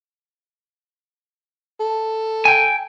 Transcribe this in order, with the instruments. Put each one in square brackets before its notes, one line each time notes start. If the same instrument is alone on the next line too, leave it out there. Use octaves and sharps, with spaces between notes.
[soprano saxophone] A4
[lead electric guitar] G5 G#5